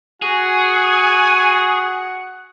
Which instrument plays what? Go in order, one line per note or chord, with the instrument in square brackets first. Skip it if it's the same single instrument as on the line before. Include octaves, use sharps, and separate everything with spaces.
[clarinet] F#4 [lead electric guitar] G#4 [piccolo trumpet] F#5 [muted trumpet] G#5